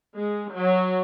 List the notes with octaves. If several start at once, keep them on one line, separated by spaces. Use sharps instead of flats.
G#3
F#3